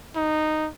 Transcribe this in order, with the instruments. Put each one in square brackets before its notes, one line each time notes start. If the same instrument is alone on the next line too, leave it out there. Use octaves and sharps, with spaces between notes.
[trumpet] D#4